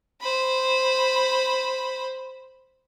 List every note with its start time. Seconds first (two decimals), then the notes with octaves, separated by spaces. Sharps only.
0.21 C5 B5